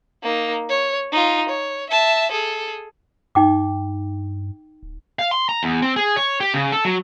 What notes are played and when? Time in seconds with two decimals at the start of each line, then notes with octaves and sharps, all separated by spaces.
0.23 A#3 D#4
0.69 C#5
1.12 D#4 F4
1.49 C#5
1.90 E5 A5
2.32 G#4 A4
3.35 G2 D#4 G5 D6
4.83 D1
5.19 F5
5.31 C6
5.49 A#5
5.63 E2
5.82 C4
5.96 G#4
6.16 C#5
6.40 G4
6.54 C#3
6.72 A4
6.85 F#3